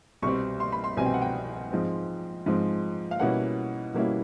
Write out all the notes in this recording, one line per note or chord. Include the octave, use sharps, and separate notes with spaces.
C2 B2 G3 C4 C#6
C6
B5
C6
C2 B2 G3 C4 G#5
G5
F#5
G5
G#2 F3 G#3 C4
G#2 F3 G#3 C4
F5
B2 G3 A#3 C#4 E4 F#5
B2 G3 A#3 C#4 E4